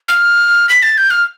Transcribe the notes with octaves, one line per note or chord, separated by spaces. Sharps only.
F6
B6
A6
G6
F6